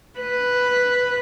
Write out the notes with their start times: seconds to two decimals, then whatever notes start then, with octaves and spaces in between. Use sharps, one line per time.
0.19 B4